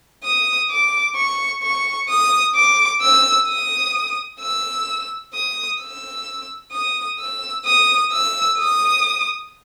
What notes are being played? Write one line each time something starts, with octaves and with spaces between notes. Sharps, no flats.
D#6
D6
C#6
C#6
D#6
D6
E6
D#6
E6
D#6
E6
D#6
E6
D#6
E6
D#6